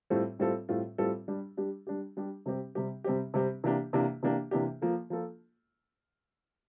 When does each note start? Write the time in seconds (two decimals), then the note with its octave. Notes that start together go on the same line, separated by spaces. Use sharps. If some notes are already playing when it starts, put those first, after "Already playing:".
0.10 A2 G3 C4 F4 A4
0.39 A2 G3 C4 F4 A4
0.69 A2 G3 C4 F4 A4
0.98 A2 G3 C4 F4 A4
1.28 G3 D4 G4
1.57 G3 D4 G4
1.87 G3 D4 G4
2.17 G3 D4 G4
2.46 C3 G3 C4 G4
2.75 C3 G3 C4 G4
3.04 C3 G3 C4 G4
3.34 C3 G3 C4 G4
3.64 C3 E3 A#3 D4 G4
3.93 C3 E3 A#3 D4 G4
4.23 C3 E3 A#3 D4 G4
4.51 C3 E3 A#3 D4 G4
4.82 F3 A#3 F4 A4
5.10 F3 A#3 F4 A4